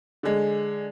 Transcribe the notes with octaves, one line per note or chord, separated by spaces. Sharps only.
D3 G#3